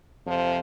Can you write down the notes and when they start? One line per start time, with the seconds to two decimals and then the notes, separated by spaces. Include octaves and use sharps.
0.24 F2 C3 F3